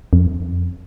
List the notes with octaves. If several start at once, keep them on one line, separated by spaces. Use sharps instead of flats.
F2